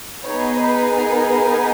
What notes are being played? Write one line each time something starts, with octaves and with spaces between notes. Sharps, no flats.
B3 D#4 G#4 C#5
B4
A#4